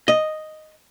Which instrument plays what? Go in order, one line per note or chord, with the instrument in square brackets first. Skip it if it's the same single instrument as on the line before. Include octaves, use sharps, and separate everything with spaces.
[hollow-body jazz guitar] D#5